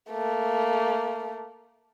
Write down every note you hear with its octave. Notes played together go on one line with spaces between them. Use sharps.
A3 A#3